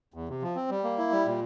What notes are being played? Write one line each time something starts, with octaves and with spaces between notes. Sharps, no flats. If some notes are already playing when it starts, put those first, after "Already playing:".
E2
C3
F3
C4
G3
A#3
E4
G3
A#2